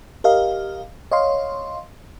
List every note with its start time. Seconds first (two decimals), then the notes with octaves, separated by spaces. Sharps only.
0.24 G4 A#4 D#5 F5
1.12 C#5 D#5 F5 C6